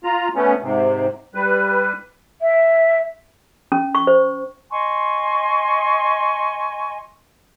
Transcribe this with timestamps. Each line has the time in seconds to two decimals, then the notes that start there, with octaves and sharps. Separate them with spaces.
0.04 F4 A#5
0.36 A3 B3 C#4
0.62 G#2 C3
1.35 G3 B4
2.39 E5
3.72 C#4
3.95 C#6
4.07 C5
4.71 D#5 G#5 C6 C#6